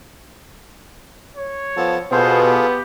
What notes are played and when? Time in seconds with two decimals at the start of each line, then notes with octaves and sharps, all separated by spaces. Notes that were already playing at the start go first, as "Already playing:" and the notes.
1.36 C#5
1.77 F3 B3 A4 A5
2.12 B2 B3 F4 G#4 A4 C5
2.45 G4